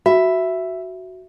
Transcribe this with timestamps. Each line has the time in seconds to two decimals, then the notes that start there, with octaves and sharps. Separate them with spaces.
0.06 F#4 E5